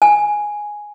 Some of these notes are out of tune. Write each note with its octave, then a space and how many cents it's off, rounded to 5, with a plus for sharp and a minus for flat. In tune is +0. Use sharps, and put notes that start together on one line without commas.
G#5 +0